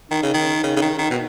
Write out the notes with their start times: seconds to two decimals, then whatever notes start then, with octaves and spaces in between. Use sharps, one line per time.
0.11 D#3 D#4
0.23 C#3
0.34 D#3
0.63 C#3
0.77 C#3
0.82 D#3
0.99 D#3
1.10 B2